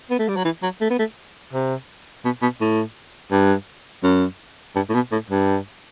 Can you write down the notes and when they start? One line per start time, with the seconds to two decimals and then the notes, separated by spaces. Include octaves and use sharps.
0.10 B3
0.19 A3
0.28 G3
0.36 F#3
0.44 E3
0.62 F#3
0.81 A3
0.90 B3
0.99 A3
1.53 C3
2.25 B2
2.42 B2
2.60 A2
3.32 G2
4.03 F#2
4.75 G2
4.89 A2
4.94 B2
5.12 A2
5.30 G2